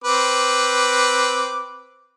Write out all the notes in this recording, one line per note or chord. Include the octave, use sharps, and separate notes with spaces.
C4 B4 D6